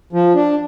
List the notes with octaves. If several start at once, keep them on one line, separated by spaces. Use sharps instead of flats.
F3
D4